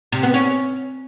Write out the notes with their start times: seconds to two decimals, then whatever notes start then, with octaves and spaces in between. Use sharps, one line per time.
0.12 C3
0.23 B3
0.34 C#4